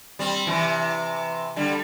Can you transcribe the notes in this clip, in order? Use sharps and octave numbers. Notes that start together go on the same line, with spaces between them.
G3 C4
C3 E3
D3 G3